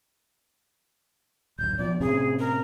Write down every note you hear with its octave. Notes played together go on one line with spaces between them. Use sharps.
D1 G#1 F#2 G6
B2 F3 D5
A2 C3 C#4 G#4
A#4